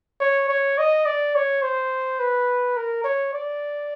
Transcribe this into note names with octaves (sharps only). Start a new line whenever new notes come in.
C#5
C#5
D#5
D5
C#5
C5
B4
A#4
C#5
D5